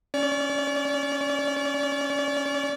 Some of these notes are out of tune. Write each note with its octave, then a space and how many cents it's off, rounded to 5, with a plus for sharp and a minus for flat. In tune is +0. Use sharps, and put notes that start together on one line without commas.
C#4 +0 D5 -35